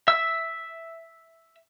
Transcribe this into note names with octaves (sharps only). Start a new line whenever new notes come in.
E5 E6